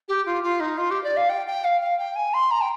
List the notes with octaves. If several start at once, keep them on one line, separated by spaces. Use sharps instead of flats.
G4
F4
F4
D#4
F4
G4
D5
F5
G5
G5
F5
F5
G5
G#5
C6
A#5
G5